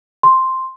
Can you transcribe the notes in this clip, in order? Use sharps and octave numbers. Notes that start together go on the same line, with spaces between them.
C6